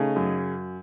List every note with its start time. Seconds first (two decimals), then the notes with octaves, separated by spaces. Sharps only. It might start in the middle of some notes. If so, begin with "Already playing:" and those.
Already playing: C#3 A3 D#4
0.16 F#2